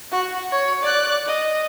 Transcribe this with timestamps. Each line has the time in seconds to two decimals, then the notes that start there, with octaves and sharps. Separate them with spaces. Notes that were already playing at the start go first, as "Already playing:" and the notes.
0.12 F#4
0.52 C#5
0.83 D5 F#6
1.27 D#5